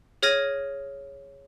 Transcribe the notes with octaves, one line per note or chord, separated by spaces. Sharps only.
G#4 C#5 F6 G#6 A#6 D#7